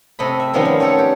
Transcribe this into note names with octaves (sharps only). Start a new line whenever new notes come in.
C3 A3 D#5 B5
E5
D#3 F3 G3 B3 C#4 C5
G3
F#4 G4 A4 B4 C#5
G4